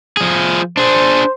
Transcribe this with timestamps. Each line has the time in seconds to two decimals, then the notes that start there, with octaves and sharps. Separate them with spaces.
0.17 F3 G#4
0.77 D4 G#4 C5